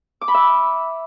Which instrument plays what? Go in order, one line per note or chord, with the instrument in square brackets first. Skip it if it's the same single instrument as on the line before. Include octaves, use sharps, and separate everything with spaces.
[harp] D6
B5
E5